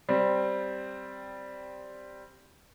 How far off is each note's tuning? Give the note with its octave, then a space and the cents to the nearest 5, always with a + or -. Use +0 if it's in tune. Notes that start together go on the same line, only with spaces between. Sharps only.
G3 -5 C4 +0